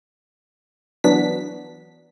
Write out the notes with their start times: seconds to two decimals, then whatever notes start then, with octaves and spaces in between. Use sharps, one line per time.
1.04 E3 F#3 B3 D4 B6